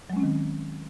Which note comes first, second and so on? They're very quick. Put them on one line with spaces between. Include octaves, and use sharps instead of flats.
F#3 G#3 C#4 C4 D#3